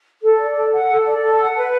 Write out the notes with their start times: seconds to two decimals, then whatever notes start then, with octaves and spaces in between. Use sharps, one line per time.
0.22 A4
0.39 D5
0.56 A4
0.73 F#5
0.89 A4
1.06 D5
1.22 A4
1.39 F#5
1.55 B4